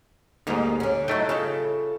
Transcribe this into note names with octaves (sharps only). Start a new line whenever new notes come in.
D2 G#2 G3 A#3 D#4
D3 C#4
F#3 A3 D#4 E4 G5
C#3 F4 A4